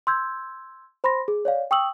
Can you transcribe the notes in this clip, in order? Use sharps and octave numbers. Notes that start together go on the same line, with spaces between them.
C6 E6 G6 G#6
C5 B5 C6 A#6
G#4
C#5 D5 F5
G5 C#6 D#6 E6 F#7